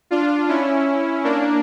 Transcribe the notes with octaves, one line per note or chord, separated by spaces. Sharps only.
D4 F4
C#4 E4
A#3 D4